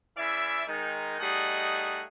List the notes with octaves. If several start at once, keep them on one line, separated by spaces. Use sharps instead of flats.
C#3 E3 E4 D5 E5
D#3 G#3 D#4
G3 A3 D#4 G#4 D#5 F#5